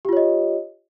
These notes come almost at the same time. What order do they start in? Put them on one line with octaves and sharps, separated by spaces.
G4 F4 C#5 D#5